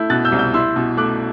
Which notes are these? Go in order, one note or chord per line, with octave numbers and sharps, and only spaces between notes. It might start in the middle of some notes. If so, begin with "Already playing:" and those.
Already playing: A3 E4 G6
B2 F#6 A6
E6 G6
C2
E6 G6
E4 C6 E6
B2
A3 D6 F#6